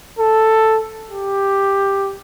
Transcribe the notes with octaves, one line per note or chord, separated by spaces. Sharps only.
A4
G4